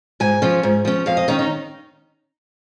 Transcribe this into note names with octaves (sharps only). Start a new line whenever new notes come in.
G#2 G#5
F3 C#4
G#2
F3 C#4
F2 F5
D#5
D#3 C#4 D#4
D#4